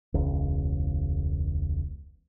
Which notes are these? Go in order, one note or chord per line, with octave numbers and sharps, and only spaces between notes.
E1 C#2